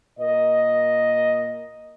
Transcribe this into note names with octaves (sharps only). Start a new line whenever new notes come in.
A#2 A#4 D#5